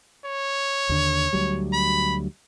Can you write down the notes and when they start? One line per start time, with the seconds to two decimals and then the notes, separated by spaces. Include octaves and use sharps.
0.25 C#5
0.89 D#2 D3
1.33 D2 F#3 G3
1.73 B5